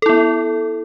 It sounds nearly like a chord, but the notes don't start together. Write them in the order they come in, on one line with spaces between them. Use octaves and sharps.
A4 E4 B3